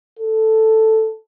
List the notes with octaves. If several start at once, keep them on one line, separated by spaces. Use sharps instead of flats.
A4